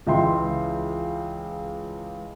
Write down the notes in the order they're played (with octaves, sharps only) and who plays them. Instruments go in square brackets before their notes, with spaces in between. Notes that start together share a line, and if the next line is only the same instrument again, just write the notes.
[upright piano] C#2 E3 E5 G5 C6